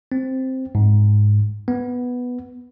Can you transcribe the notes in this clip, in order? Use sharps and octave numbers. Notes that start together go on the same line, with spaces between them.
C4
G#2
B3